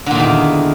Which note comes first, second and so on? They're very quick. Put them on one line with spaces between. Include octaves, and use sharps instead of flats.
D3 A#2 E2 D#3